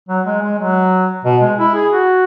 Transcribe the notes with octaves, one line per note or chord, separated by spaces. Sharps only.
F#3
G#3
G#3
F#3
B2
G#3
E4
G#4
F#4